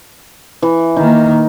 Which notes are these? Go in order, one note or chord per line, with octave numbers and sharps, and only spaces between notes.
E3
D#3 A#3 D#4